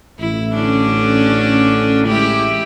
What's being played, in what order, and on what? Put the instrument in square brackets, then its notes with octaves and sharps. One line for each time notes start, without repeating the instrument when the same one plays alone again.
[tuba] A1 [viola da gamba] E4
[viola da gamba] D3 C#4 D4
G#3 E4 G4